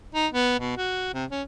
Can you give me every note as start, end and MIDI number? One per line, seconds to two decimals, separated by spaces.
0.15 0.27 63
0.33 0.57 59
0.60 0.77 47
0.77 1.13 66
1.14 1.25 48
1.31 1.42 61